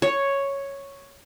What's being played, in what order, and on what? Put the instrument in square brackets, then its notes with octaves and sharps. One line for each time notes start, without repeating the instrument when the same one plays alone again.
[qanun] C#5